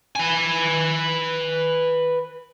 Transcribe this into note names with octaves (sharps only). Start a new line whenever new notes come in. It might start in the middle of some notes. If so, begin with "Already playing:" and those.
B4 G#5